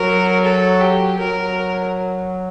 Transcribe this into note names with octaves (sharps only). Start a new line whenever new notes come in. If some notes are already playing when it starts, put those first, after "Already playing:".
Already playing: F#3 A#4
A4
G4
F#3 A#4